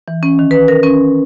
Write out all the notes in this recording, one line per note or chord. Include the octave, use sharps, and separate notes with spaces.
E3
C#4
D#3
B4
A#4
C#4